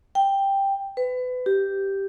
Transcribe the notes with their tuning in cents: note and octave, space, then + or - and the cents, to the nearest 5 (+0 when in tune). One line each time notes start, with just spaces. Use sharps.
G5 +5
B4 +30
G4 +0